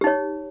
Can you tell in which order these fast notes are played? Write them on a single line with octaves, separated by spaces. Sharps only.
G4 D#4 C#5